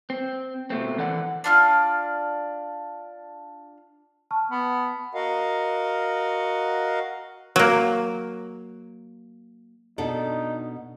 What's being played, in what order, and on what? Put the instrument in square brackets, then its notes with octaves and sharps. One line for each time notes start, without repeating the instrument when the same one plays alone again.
[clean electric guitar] C4
B2 A3 C4
E3 A4 D5 F#5
[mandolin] D4 F4 F6
[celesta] A5 C#6 F6
[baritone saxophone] B3
[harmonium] F#4 A#4 D#5 F5 F#5
[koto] F#3 A#3
[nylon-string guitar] B2 D4 A4 [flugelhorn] D#4